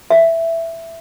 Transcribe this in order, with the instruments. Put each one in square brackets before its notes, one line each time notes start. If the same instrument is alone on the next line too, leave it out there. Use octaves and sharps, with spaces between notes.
[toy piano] E5